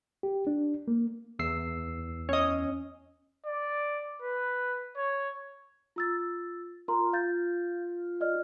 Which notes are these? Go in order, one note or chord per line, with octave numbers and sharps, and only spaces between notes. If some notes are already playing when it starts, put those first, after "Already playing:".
G4
D4
A#3
E2 E6 C7
C#4 D#5
D5
B4
C#5
F4 E6 A6
F4 A#4 A#5 C6
F5 G6 A6
D5 D#5 F6